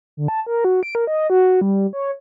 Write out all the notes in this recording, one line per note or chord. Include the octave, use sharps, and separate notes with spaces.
D3
A5
A#4
F#4
D7
A#4
D#5
F#4
G3
C#5